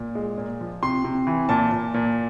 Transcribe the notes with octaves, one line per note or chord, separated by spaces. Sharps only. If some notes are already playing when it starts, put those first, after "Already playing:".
Already playing: A#2
G#3
A#2
F3
C3 C6
C3
E3
A#2 A5
A#2
A#2